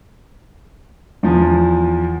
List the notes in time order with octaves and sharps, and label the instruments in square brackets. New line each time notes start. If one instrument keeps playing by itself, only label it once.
[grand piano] E2 F3